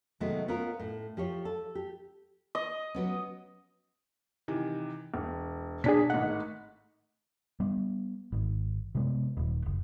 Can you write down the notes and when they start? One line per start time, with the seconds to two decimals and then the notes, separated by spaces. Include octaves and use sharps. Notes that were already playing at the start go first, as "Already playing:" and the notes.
0.20 C3 D#3 F#3 G#3 A3 B3
0.48 B3 C#4 F4 A#4
0.79 A2
1.17 F3 G4 C#5
1.45 A4
1.75 G4
2.55 D#5
2.95 F#3 B3 C#4
4.48 C3 D#3 E3
5.14 E1
5.84 B2 D4 G#4 C#5 B6
6.10 G#1 A2 D#4 F#5
7.60 G3 B3
8.32 G#1
8.95 C3 G#3 B3
9.37 D#1
9.66 F#1